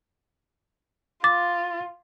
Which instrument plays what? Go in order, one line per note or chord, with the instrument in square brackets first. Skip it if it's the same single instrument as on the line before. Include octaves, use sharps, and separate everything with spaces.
[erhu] F4 [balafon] D6 [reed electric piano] A6